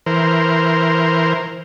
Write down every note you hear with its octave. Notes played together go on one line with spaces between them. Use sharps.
E3 A#4 C5